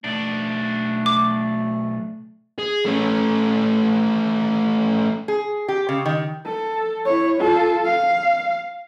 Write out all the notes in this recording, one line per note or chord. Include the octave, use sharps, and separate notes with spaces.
B1 A3 D4
D6
G#4
A3 C#4
G#4
G4
C#3
D#3
A4
E4 C#5
F4 A4
F5